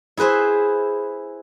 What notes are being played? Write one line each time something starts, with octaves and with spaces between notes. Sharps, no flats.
E4 G#4 B4 C5 E5